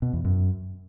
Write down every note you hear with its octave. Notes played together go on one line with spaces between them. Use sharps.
B2
E2
F#2